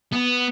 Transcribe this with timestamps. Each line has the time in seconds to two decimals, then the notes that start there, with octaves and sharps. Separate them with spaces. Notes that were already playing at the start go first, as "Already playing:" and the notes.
0.13 B3